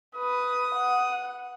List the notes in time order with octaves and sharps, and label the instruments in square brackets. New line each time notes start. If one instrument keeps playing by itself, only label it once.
[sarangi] B4 [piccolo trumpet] D#6
[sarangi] F#5